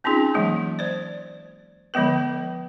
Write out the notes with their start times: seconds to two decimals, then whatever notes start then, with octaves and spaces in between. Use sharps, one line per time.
0.04 C4 C#4 D#4 F4 G#4
0.34 E3 F#3 G#3 A#3
0.79 C5 D5
1.94 D3 F3 G#3 B3 B4